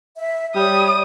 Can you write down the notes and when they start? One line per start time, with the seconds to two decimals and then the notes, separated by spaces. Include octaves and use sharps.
0.17 E5
0.56 G3 C#5 D5 D#6